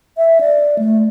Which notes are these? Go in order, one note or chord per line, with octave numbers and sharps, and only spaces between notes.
E5
D5
A3